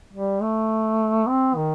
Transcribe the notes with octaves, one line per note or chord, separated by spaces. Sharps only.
G3
A3
C4
D#3